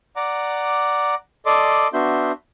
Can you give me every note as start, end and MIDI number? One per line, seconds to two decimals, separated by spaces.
0.16 1.15 74
0.16 1.15 78
0.16 1.15 82
0.16 1.15 86
1.46 1.88 69
1.46 1.88 74
1.46 1.88 75
1.46 1.88 84
1.46 1.88 86
1.93 2.32 59
1.93 2.32 62
1.93 2.32 66
1.93 2.32 76
1.93 2.32 84
1.93 2.32 91